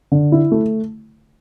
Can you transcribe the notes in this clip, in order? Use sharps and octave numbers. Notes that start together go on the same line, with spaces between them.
D3
E4
A3